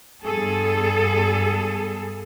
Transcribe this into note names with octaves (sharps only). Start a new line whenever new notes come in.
G2 B3 G#4 A4